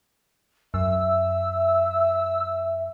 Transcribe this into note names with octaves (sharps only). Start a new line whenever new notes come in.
F#2 E5 E6